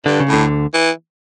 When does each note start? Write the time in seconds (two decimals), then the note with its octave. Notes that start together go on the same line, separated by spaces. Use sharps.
0.06 G2 D3
0.20 C#3
0.29 D2 A2 D3
0.74 E3